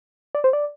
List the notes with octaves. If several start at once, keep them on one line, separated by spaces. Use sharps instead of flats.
D5
C5
D5